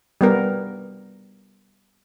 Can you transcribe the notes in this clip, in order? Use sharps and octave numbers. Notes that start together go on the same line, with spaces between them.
G3 B3 A#4